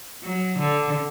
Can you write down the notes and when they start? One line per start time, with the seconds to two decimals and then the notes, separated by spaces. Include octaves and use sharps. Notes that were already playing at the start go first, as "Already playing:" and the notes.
0.23 F#3
0.59 D3